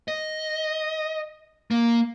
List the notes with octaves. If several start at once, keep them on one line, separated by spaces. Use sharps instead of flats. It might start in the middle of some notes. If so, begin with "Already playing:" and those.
D#5
A#3